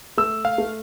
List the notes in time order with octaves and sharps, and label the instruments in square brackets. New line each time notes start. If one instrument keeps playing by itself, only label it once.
[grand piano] A3 [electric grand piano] E6
[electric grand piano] F5
[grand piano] A3